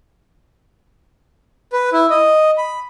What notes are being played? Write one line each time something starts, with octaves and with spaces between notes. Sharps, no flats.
B4
E4
D#5
B5